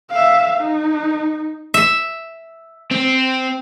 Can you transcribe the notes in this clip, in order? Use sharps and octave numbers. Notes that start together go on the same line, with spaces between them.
E5 F5
D#4
E5
C4